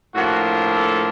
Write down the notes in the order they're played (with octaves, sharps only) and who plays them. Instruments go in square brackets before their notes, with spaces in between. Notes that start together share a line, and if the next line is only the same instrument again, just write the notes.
[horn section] A2 F3 A#3 D4 F#4
F#4
A4